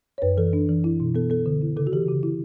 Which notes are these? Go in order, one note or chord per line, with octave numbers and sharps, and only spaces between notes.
C#5
F#2 B4
E3 A4
D4
E3
E4
B2
B3 A4
B3 A4
D3
E4
C#3 A4
F#4
E3 G4
C#3 F#4
E4